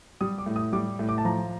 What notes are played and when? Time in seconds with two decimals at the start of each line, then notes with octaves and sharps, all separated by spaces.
0.21 G3 D#6
0.38 D6
0.46 A2
0.56 D#6
0.73 G3 D6
0.99 A2
1.09 D6
1.18 A5
1.25 F3 A#5